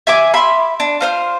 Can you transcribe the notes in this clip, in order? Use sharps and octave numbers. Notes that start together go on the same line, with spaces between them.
E5 G#5 D6
E5 B5 C6
D4
F4 C5 F6